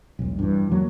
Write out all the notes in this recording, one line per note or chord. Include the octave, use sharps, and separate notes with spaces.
E1 B1
G2 E3
E2 F#3 A#3